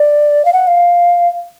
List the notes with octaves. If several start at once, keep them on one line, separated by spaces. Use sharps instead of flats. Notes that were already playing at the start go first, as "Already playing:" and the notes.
Already playing: D5
F5
F#5
F5